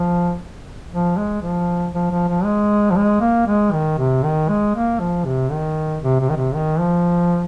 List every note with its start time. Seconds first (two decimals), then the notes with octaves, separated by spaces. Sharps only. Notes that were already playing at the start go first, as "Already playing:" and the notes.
Already playing: F3
0.91 F3
1.17 G#3
1.42 F3
1.93 F3
2.11 F3
2.28 F3
2.44 G#3
2.90 F3
2.96 G#3
3.21 A#3
3.46 G#3
3.73 D#3
3.98 C3
4.23 D#3
4.49 G#3
4.75 A#3
5.00 F3
5.25 C3
5.51 D#3
6.03 C3
6.20 C3
6.29 D#3
6.36 C3
6.55 D#3
6.79 F3